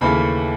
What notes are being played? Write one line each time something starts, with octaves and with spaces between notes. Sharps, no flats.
D#2 C#3 E3 A3 B5